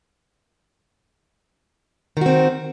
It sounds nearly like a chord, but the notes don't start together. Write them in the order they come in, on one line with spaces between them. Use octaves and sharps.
D#3 F#4 C4